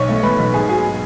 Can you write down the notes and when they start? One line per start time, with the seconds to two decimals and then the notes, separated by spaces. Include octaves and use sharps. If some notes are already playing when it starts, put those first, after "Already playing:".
Already playing: B1 C#5 C#6
0.09 A3
0.23 A3 B4 B5
0.39 B1
0.54 G#2 G#4 G#5
0.69 F#3 G#4 G#5